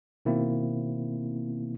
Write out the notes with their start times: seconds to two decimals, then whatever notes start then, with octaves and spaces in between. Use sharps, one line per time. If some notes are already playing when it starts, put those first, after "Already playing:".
0.25 B2 D#3 A#3 C4 E4